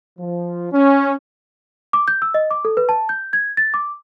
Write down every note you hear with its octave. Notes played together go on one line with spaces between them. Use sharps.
F3
C#4
D6
G6
E6
D#5
D6
A4
B4
A5
G6
G#6
A6
D6